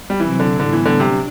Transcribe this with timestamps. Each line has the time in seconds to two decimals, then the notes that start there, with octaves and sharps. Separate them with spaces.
0.10 G3
0.20 C3 E3 F#3 C4 E4
0.40 D3
0.59 A2 D3 G3 B3 E4
0.73 E3
0.85 D3
1.00 C3 F#3 D4